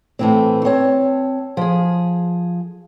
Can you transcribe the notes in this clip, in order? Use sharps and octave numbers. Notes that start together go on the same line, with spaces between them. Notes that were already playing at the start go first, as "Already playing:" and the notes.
A2 E3 C4
C4 C#5 A5
F3 G#4